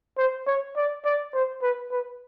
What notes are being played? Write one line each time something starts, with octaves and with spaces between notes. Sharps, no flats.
C5
C#5
D5
D5
C5
B4
B4